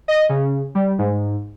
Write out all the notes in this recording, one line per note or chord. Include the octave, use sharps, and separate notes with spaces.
D#5
C#3
G3
G#2